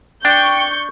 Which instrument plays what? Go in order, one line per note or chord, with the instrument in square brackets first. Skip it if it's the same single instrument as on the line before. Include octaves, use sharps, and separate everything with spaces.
[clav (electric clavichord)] D4 [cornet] G5 [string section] C#6 G6